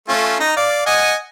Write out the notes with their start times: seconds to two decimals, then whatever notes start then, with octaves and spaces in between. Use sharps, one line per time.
0.09 A3 C#4 F4
0.40 D#4 A#5
0.56 D5 F5
0.86 D#5 F#5 G#5